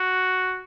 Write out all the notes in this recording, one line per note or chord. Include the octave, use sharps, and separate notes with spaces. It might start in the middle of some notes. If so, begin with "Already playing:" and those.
Already playing: F#4